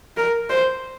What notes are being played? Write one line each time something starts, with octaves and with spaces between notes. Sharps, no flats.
A#4
C5